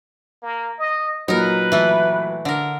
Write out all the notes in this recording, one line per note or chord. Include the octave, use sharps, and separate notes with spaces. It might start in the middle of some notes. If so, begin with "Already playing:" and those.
A#3
D#5
A#2 F#3 D#4 A#4 B4
E3 A3
D3 A#4